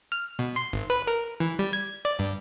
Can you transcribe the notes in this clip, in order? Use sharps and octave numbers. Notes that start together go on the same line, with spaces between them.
F6
B2
C6
G#1
B4
A#4
E3
G3
G#6
D5
G2